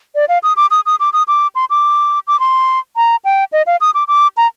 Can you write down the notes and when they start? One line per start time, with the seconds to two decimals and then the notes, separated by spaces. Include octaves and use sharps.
0.15 D5
0.29 F5
0.43 D#6
0.57 D6
0.71 D#6
0.86 D#6
1.00 D6
1.13 D#6
1.28 D6
1.55 C6
1.70 D6
2.27 D6
2.40 C6
2.96 A#5
3.25 G5
3.53 D#5
3.67 F5
3.81 D#6
3.94 D6
4.08 D6
4.37 A#5